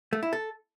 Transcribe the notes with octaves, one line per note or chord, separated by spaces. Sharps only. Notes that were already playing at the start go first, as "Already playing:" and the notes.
A3
E4
A4